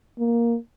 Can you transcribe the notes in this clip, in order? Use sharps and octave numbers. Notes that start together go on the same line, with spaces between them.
A#3